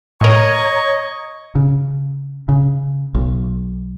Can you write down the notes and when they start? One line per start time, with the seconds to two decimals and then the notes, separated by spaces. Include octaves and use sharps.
0.21 A2 A#4 C#5 D#5 A#5 C#6 G#6
1.55 C#3
2.49 C#3
3.15 B1